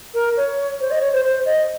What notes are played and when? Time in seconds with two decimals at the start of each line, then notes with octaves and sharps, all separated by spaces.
0.14 A#4
0.37 C#5
0.81 C5
0.91 D#5
1.01 C#5
1.13 C5
1.24 C5
1.46 D#5